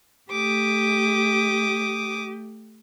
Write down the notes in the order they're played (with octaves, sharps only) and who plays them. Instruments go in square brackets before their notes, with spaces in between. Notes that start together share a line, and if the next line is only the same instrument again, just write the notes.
[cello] A3 G4 [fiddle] D6 D#6